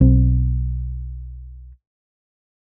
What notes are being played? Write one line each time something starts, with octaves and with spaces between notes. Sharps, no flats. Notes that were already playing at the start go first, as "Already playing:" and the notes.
B1 C4